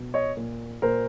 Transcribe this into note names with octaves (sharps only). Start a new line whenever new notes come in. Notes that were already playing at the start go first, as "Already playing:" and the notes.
Already playing: B2
C#5 D#5
A#2
A#2 A#4 C5